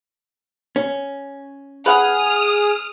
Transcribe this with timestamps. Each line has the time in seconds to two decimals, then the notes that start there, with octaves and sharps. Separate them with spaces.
0.76 C#4
1.86 G#4 B4 F#5 D#6 F6